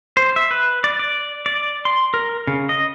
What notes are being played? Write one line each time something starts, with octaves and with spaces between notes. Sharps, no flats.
C5
E5
B4
D5
D5
D5
C6
A#4
C#3
D#5